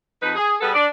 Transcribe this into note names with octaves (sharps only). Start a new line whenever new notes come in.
F2 D#4 B4
G#4
G3 B3 G#4 A4 B4
D4 D5